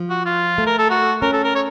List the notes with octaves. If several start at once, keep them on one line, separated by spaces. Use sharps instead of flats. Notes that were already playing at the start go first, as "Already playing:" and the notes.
Already playing: F3
F#4
F4
A3
A#4
A4
F#4
C#4 A#4
A4
A#4
C#5